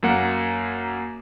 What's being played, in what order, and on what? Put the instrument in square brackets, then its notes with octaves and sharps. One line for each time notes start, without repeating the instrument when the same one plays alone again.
[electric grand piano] F#2 A#3 F#5